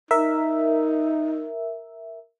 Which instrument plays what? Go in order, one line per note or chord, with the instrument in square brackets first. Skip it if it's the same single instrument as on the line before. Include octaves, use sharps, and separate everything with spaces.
[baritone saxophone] D#4 [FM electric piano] A#4 E5